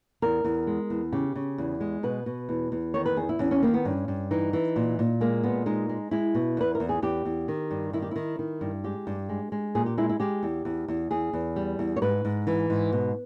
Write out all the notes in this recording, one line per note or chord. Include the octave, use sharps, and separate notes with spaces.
E2 A#4
E2
G#3
E2
C#3 G4
C#3
E2
G#3
B2 B4
B2
E2
E2
D#3 C#5
B4
E2 G#4
E4
E2 C#4
C#4
D#3 A#3
B3
G2 C#4
G2
E3 D#4
E3
A#2
A#2
G#3 A#3
A#2 B3
G#3 D#4
G#3
G#3 E4
B2
E2 B4
A#4
E2
G#4
E2 G4
E2
D#3
G2
D#3 E4
G4
D#3 E4
D#3
G2
G#3 G4
G2
G#3
G#3
A#2 G#4
G4
G#3 E4
E4
G#3 G4
E2
E2
E2
E2 G#4
E2
G3
E2
C#5
G#2 B4
G#2
E3
G#2
B2